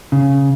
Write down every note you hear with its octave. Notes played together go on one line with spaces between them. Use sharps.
C#3